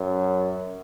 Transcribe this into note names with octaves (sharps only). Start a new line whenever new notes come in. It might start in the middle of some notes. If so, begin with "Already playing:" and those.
Already playing: F#2